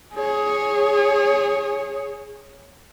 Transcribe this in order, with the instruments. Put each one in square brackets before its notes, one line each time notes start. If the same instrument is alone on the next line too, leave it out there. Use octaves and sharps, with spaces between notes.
[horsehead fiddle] G#4 C#5